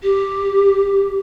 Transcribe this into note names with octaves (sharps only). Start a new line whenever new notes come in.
G4